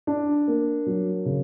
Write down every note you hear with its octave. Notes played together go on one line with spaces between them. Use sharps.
D4
A#3
F#3
C#3